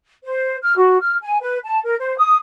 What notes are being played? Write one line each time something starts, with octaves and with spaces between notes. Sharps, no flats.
C5
F6
F#4
F6
G#5
B4
A5
A#4
C5
D#6